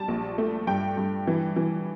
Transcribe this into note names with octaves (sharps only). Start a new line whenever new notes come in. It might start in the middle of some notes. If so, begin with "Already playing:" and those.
Already playing: G3 A5
A#1
A3
G2 G5
G2
E3
E3